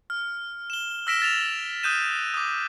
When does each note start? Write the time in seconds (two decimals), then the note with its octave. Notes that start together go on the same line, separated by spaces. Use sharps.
0.10 F6
0.70 E7 G7
1.07 E6 F6 A#6 B6 D7 E7
1.22 A6 E7 F7
1.83 D#6 F#6 G6 D#7 E7
2.34 D6 D#6